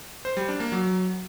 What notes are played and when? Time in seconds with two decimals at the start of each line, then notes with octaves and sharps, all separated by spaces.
0.25 C5
0.37 G3
0.48 D4
0.60 A#3
0.72 F#3